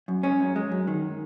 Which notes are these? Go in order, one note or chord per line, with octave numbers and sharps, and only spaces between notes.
F#2
G#3 C#4
F#2
G#3
F#2
D#3